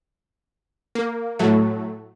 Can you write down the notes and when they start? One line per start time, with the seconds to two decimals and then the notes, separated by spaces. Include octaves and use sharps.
0.95 A#3
1.39 A2 F#3 A3